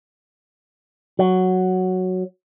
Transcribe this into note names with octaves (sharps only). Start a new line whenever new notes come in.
F#3